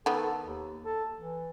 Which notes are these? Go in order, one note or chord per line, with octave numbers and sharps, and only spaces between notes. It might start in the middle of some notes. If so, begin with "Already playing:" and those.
D#3 B3 A4
D#2
A4
E3